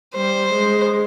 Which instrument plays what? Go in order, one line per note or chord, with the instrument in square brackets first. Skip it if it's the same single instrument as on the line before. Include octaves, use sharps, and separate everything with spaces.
[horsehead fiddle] G3 [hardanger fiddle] C5
[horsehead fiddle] G#3